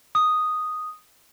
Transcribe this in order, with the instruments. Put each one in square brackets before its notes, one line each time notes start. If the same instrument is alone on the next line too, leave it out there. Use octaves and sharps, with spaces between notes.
[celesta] D#6